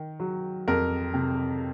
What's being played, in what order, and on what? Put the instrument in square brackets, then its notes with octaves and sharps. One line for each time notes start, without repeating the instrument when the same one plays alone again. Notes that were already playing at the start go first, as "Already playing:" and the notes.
Already playing: [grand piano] D#3
F#3
F2 A#4
C3